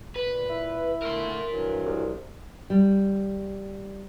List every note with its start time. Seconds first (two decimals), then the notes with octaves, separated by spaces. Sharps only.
0.16 A#2 B4
0.49 E4
1.03 D3 A3 A#4 C6
1.46 G2 E3 F#3
1.84 C2
2.70 G3